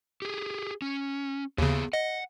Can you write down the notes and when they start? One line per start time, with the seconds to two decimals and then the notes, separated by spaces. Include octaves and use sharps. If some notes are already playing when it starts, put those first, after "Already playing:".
0.22 G4 G#4
0.82 C#4
1.58 D#2 C#3 B3 G#4
1.93 D#5 F#5